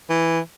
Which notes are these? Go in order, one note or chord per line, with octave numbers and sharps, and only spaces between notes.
E3